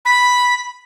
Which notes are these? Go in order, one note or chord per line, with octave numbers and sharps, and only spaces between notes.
B5